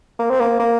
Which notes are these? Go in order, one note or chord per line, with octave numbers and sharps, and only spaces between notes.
A#3
C4
A#3
A#3